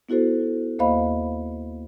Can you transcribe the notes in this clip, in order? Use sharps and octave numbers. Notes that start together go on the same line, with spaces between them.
B3 E4 F#4 A4 C5
D#2 A#3 C5 D#5 F5 B5